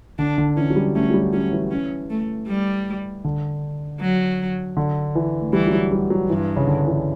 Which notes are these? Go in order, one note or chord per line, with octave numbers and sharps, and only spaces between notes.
D3 D4
D3
E3 C#4
F#3
G3
A3 C#4
F#3
G3
F#3 C#4
E3
C#4
A3
G3
D3
F#3
D3
E3
A3
E3 G3
F#3
G3
G3
F#3
G2 E3
C#3
D3
E3